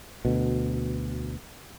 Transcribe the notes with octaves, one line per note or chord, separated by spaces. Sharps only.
D2 B2